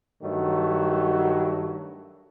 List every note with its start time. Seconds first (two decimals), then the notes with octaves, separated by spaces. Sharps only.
0.22 G2 D#3 F#3 A3 F#4